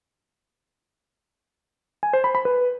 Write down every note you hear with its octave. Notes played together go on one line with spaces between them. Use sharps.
G#5
C5
B5
B5
B4